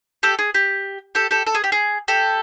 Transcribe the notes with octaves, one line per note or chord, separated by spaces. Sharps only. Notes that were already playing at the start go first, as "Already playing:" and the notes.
G4 A4
G#4
G4
G4 A4
G4 A4
A4
G#4
G4
G#4
G4 A4